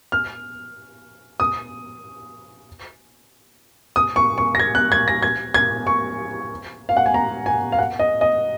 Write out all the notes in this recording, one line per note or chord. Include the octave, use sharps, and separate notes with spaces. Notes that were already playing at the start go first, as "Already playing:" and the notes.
F6
D#6
D#6
C#6
C#6
A#6
G#6
F#6
G#6
A#6
G#6
G#6
C#6
F5
F#5
G#5
A#5
G#5
F5
F#5
D#5
D#5